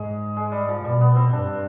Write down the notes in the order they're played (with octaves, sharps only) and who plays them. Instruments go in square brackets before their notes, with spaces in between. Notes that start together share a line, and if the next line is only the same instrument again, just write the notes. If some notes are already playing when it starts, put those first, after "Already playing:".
Already playing: [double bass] G#2 [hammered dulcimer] G#3
[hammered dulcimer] G#3
G3
F3
[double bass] B2 [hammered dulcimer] G3
[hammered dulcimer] B3
C4
[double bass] G2 [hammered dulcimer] D4